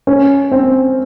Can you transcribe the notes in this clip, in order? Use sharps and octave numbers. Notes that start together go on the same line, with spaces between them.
C#4
C4